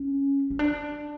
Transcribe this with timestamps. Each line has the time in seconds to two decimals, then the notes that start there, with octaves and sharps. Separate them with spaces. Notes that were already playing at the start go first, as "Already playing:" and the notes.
Already playing: C#4
0.50 C#4
0.59 D4